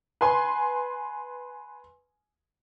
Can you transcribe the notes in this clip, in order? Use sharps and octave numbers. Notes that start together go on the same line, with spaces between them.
B4 G#5 C6